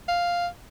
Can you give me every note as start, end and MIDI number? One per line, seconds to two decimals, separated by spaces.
0.08 0.47 77